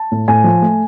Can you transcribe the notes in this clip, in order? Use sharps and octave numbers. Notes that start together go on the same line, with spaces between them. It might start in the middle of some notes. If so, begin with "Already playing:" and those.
Already playing: A5
A2
A2 G#5
F3
A3